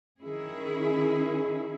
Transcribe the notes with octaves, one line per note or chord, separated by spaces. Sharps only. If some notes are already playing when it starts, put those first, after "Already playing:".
D#3 C#4 E4 G#4